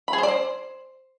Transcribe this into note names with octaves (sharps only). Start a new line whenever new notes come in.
B5
G#4
C5
D5
C5